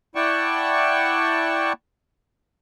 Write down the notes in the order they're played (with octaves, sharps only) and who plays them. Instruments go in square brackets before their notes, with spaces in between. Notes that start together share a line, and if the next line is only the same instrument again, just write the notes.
[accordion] E4 D5 F#5 G5 A5 C#6